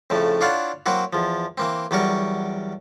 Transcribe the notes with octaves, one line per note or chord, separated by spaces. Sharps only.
F2 A2 C#3 A3
D4 E4 F4 C#5 F5 F#5
F#3 A#3 C4 E4 F#4
E2 F3
E3 A#3 C4
E2 F#3 G3 A#4 C#6